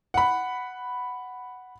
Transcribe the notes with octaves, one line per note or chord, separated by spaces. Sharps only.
F#5 B5